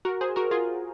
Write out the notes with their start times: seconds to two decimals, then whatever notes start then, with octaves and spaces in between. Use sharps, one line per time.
0.05 F#4 A#4
0.21 G#4 C5
0.36 F#4 A#4
0.51 F4 G#4